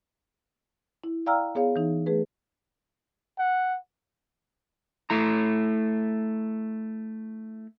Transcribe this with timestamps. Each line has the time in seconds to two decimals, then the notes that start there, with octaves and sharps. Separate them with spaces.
1.04 E4
1.26 D5 F5 G5 A#5 E6 F6
1.55 B3 G#4 C#5 F5
1.76 E3 D#4
2.06 A3 G#4 B4
3.38 F#5
5.10 A3 E4 A#5